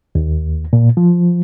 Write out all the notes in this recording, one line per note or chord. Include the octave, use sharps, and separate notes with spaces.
D#2
A#2
F3